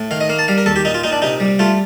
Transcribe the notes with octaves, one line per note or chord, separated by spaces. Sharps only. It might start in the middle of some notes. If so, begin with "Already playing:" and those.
Already playing: A2
D#3 F5
D#5
A#3 F5
A5
G3 F5
A#4
D#2 A4
G4
A#2 D#4
F4
A#2 D#4
D4
C3 D#4
G3
A3 F4